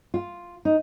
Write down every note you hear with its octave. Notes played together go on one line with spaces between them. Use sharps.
F4
D#4